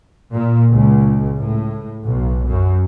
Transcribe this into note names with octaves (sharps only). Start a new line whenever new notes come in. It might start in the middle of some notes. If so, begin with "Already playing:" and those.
A#2
C#2
A2
B1
F#2